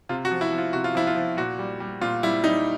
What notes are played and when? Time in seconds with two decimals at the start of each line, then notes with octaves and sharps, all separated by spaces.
0.09 C3 F4
0.25 F#4
0.31 F3
0.41 E4
0.53 F3
0.58 F4
0.73 C3 F#4
0.84 F4
0.95 F3 E4
1.07 F4
1.16 F3
1.37 A#2 F#4
1.59 G3
1.80 G3
2.01 A#2 F4
2.23 G3 E4
2.44 G3 D#4